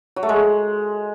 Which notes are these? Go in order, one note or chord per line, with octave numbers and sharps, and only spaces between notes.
F#3
A3
G#3